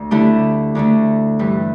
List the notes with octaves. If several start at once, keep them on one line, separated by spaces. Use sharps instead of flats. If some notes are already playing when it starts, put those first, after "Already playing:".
Already playing: D2
D3 A3 E4 G4
D2 D3 A3
G2 E3 G3